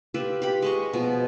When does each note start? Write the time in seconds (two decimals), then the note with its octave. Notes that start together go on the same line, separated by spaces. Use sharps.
0.14 F4 G4 B4 E5
0.42 G4 B5
0.62 G#3 D#5 C#6
0.93 B2 F3